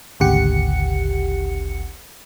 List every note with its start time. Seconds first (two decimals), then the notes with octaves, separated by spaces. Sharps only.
0.20 G#1 D2 C#3 G4 F#5 C#7